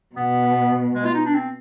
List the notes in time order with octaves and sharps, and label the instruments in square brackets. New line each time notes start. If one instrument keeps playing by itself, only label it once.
[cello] B2 [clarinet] B3
[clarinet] G#3
F4
D#4
D4
C4